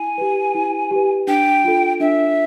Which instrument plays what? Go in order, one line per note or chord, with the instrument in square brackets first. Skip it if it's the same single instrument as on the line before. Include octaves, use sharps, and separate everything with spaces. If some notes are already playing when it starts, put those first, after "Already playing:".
Already playing: [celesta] E4 [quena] G#5
[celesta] G4 B4
E4
G4 B4
[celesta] D4 [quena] G5
[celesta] F4 A4
[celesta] D4 [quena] E5